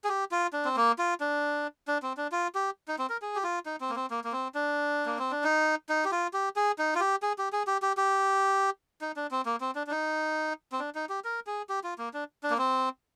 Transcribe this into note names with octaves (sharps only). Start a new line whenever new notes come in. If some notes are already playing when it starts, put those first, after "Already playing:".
G#4
G4
F4
D4
C4
A#3
F4
D4
D4
C4
D4
F4
G4
D#4
C4
A#4
G#4
G4
F4
D#4
C4
A#3
C4
A#3
A#3
C4
D4
A#3
C4
D4
D#4
D#4
G4
F4
G4
G#4
D#4
F4
G4
G#4
G4
G#4
G4
G4
G4
D#4
D4
C4
A#3
C4
D4
D4
D#4
C4
D4
D#4
G4
A#4
G#4
G4
F4
A#3
D4
D4
A#3
C4